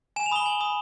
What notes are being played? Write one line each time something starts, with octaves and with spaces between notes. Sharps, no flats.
G#5 E7
F7
B5 D#6 G7
G#5 F#7
B5 D#6